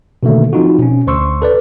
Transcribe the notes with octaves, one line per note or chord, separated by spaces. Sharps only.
B2 D3 D#3 A3 A#3
F3 C4 D#4 F4 F#4
B2 C#4
D2 C5 C6 C#6 E6
A4 B4 D5